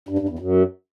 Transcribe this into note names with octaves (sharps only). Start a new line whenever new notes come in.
G2
G2
E2
F#2